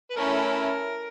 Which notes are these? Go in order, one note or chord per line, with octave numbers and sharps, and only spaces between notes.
B4
A3 C#4 E4 A4 A#4